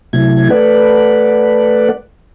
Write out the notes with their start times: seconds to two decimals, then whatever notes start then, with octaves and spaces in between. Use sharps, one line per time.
0.13 C3 F#3 A3 E4 G#6
0.50 A3 A4 B4 D5 F#5